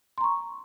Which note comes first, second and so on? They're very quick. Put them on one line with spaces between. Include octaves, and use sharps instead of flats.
C6 A#5 C#6